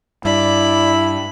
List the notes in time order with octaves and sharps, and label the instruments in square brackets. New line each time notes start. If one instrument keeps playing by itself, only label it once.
[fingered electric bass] G2 [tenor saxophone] E4 [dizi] D5 [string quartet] B5